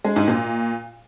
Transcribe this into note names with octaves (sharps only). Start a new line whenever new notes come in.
G#3
G#2
A#2